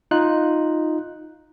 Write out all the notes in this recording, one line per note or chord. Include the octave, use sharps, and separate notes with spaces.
D#4 F4 F#6